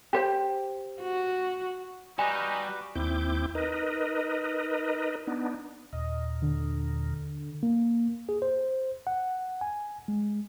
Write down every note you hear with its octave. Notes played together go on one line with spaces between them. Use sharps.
G4 C5 G5
F#4
G3 D#4 F#4 B4 G#5 D6
D#2 C4 E4 D6 G6
D#4 A#4 B4 D#5
B3 D4 D#4
D#2 A#2 D#5
D3
A#3
G#4
C5
F#5
G#5
G#3